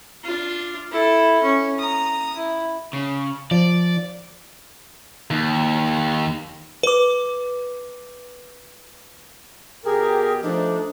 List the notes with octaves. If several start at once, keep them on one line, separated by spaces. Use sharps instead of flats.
D4 F4
E4 A4
C#4
A#5 D#6
E4
C#3
F3 D5
D#2
B4 D6
B2 G4 G#4 A#4
F3 A3 D4 D#4